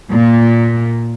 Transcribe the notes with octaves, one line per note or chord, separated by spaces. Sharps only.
A#2